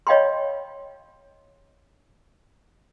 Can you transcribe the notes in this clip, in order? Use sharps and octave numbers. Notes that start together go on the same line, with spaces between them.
C#5 D#5 F5 G5 B5 C6